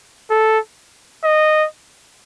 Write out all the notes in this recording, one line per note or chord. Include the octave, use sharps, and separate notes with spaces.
A4
D#5